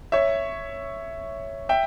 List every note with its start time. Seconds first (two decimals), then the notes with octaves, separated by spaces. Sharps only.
0.12 C#5 E5
1.69 E5 G5